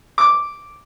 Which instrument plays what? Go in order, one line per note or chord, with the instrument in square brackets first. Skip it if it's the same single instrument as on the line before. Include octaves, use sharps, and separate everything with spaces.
[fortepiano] D6